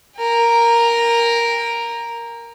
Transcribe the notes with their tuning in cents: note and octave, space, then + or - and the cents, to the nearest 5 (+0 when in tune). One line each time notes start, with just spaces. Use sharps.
A#4 +0 G5 +40